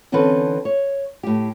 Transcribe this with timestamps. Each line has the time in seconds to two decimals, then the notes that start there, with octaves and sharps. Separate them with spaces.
0.12 D3 E3 C4 C#4 A4 B4
0.65 C#5
1.23 A2 G4